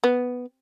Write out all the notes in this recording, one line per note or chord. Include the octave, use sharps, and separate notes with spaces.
B3